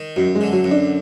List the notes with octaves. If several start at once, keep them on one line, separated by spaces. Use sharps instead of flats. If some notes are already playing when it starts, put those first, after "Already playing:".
Already playing: D#3
F#2 F#3
G#3
D3
F#3
F#2
D4